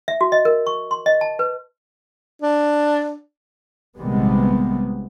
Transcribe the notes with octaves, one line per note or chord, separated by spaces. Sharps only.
E5
F#4
D#5
A#4
C#6
C6
D#5
A5
B4
D4
A#1 C3 D#3 G3 G#3 B3